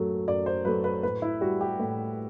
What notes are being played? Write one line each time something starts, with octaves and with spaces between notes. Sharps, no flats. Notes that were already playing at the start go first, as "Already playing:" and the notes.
Already playing: F#2 F#3 A3
F#2 D5
C5
F#3 A3 B4
B4
A2 B4
E4
G3 F#4
G4
A2